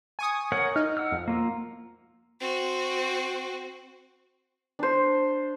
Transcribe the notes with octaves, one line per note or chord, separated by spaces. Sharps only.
G#5 C#6 D#6
A#4 C#5 F#5
D#4 F6
F#5 E6 F6
F2
A#3 F4
C4 F#4
D4 C5